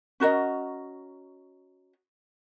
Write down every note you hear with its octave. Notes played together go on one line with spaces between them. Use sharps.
C#4 F#4 A#4 D#5